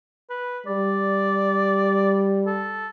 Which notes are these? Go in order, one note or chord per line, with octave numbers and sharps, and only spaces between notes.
B4
G3 D5
A4